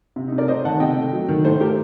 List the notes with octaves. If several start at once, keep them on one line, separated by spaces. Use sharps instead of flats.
C3
C3 D#4
A#4 D5
A3 C5 D#5
D#3 F#5 A5
A5
C3 D#5 G5
A3
F#3
D#3
A2 A4 C5
A3 G4 A#4